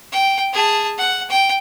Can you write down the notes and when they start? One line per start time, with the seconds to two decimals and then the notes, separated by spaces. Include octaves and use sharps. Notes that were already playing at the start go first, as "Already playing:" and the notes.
0.12 G5
0.53 G#4 A5
0.98 F#5
1.30 G5